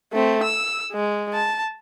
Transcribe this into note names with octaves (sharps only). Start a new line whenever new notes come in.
A3 C4
E6
G#3
A5